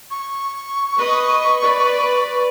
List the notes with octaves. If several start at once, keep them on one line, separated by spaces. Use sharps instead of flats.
C#6
B4 D#5
B4 D5